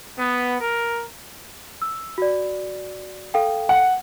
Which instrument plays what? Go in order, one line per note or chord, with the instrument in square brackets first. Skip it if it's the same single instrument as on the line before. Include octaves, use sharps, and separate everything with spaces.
[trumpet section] B3
A#4
[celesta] E6
F#4 D5
A4 F5 G5
[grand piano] F#5